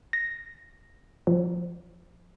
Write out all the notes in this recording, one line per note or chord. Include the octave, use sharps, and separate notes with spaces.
A#6
F3